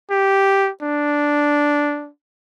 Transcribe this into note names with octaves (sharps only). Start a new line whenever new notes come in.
G4
D4